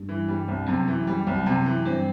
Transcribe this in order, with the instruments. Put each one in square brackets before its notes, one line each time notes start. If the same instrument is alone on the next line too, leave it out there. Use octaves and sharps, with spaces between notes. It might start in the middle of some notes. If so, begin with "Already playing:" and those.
Already playing: [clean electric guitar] G2
[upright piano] E3
G3
C2
[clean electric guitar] F#2 [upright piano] C3
[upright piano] E3
G3
C2
C3
E3
[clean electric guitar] G2 [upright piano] C4